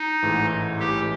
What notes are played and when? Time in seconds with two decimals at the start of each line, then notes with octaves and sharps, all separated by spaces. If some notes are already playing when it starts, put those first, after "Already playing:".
Already playing: D#4
0.23 A1 G#2 E3 A3
0.80 A1 A2 E3 G4